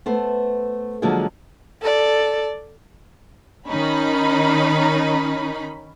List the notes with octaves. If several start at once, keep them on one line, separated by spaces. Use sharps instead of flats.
A3 B3 C5
D3 F3 F#3 G#3 A#3 F4
A4 D5
D#3 C#4 D#4 B5